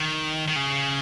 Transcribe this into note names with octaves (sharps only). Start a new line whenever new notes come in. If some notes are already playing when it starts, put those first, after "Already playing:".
Already playing: D#3
D#3
C#3